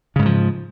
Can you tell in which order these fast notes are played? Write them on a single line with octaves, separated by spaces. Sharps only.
C#3 G#2 E3 F3